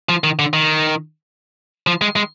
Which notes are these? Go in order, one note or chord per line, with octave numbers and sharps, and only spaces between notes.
F3
D#3
D3
D#3
F3
G#3
G#3